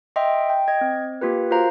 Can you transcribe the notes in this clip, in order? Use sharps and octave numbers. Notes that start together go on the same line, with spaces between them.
D#5 E5 G5 C6
G5
D#5 G#6
C4
A#3 F4 G4 B4
F4 F#4 A#4 C5 F5 A#5